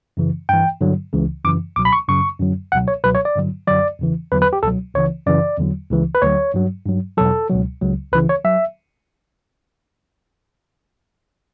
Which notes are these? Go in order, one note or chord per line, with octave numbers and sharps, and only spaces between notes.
F#2 C#3 E3
G2 E3 G5
G2 D3 F#3
C#2 C#3 E3
F#2 C#3 E3 D6
C#2 B2 F#3 D6
B5
C#6
F#2 C#3 F#3 C#6
F#2 D3 F#3
C#2 B2 F#3 F#5
C#5
C#2 B2 F#3 B4
C#5
D5
G2 D3 F#3
F#2 D3 F#3 D5
E2 C#3 E3
E2 D3 F#3 B4
B4
G4
C#2 B2 F#3 A4
C#2 C#3 E3 C#5
F#2 C#3 E3 D5
E2 D3 F#3
C#2 C#3 E3
B4
D2 D3 F#3 C#5
G2 F#3
G2 F#3
E2 B2 F#3 A4
C#2 B2 F#3
C#2 C#3 F#3
C#2 C#3 E3 B4
C#5
F#3 E5